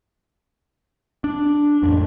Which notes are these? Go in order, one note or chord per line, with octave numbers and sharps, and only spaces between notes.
D4
A1 F2